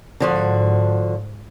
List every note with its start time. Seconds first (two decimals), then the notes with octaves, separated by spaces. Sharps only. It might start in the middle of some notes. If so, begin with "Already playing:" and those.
0.20 G#2 D3 F3 F#4